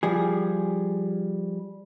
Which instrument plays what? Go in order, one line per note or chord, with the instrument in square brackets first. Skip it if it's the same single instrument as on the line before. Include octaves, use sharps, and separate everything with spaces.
[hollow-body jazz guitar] F3 G3 G#4